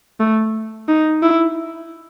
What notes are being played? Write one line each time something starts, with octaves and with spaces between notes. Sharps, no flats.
A3
D#4
E4